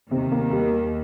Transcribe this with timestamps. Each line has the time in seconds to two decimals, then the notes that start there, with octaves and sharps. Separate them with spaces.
0.11 D#2 C3 D#3
0.32 A#3
0.51 G3